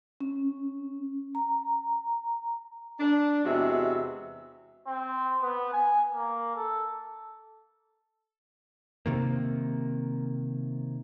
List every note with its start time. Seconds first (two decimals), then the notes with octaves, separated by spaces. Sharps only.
0.20 C#4
1.35 A#5
3.00 D4
3.44 E2 C3 G#3 F#4 E5
4.87 C4
5.42 B3
5.73 G#5
6.12 A#3
6.55 A4
9.06 C3 D#3 A#3